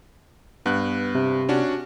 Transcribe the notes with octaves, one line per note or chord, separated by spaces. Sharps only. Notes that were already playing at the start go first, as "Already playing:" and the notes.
G2 B3 F#6
C3
C#4 D4 F#4